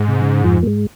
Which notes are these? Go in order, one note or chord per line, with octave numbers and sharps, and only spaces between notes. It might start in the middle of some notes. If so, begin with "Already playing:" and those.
Already playing: G#2
C3
C#3
F2 F3
A#3
G#2 G#3